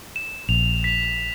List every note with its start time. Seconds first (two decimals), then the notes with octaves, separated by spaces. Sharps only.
0.16 E7
0.49 A#1 F7
0.84 B6 F7